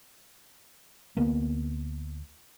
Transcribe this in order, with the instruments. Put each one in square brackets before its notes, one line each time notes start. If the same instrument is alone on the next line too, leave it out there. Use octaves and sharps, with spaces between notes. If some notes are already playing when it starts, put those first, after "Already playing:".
[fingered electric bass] D2 A#3 B3